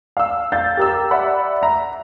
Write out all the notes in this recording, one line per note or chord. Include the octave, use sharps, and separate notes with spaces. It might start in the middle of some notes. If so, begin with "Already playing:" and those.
F5 E6
F5 G6 A6
G4 A#4 E6
D5 E5 F#5 B5
E5 A#5